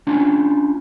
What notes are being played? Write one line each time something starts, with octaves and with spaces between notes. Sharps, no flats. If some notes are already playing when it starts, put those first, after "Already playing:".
C#4 D4 F4